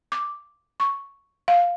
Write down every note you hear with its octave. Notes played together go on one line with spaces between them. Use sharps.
D6
C#6
F5